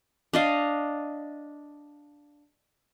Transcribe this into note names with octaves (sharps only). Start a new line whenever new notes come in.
D4 D#5 F5